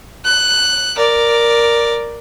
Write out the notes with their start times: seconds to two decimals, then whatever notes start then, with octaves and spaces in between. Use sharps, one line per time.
0.25 F#6
0.96 A#4 D5